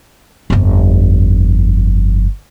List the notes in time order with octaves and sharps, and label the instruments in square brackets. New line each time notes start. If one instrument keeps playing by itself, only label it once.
[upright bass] G1 F2